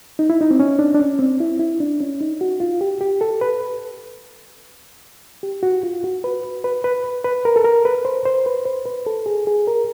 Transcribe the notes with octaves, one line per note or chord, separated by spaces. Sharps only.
D#4
E4
D#4
C4
C#4
D4
D4
C#4
C4
E4
E4
D4
C#4
D#4
F#4
F4
G4
G4
A4
B4
G4
F#4
F4
F#4
B4
B4
B4
B4
A#4
A4
A#4
B4
C5
C5
B4
C5
B4
A4
G#4
G#4
A#4